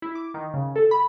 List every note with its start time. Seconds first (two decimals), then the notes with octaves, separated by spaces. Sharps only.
0.02 E4
0.15 D6
0.34 D#3
0.54 C#3
0.76 A4
0.91 B5